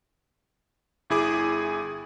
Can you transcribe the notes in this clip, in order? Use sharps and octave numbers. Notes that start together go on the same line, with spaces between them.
G1 E4 G#4 D6